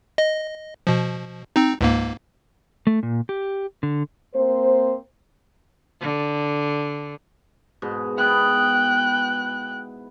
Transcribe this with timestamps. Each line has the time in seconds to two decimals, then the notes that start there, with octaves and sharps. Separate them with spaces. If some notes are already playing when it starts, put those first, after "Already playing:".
0.18 D#5
0.87 B2 F3
1.56 C4 D#4
1.81 C#2 G#2 A#3
2.87 A3
3.03 A#2
3.29 G4
3.83 D3
4.34 A#3 C4 C5
6.01 D3
7.82 G#2 B2
8.18 B3 E4 G5 F#6